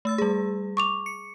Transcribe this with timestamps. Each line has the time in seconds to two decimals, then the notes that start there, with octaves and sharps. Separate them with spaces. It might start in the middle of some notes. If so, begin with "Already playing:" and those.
0.05 A3 E6 A6
0.18 G3 G#4
0.77 C#6 D6 F7
1.06 C#7